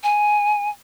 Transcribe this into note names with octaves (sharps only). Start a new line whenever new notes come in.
G#5